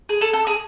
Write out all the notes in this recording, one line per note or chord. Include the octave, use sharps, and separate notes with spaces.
G#4
A4
A4
G#4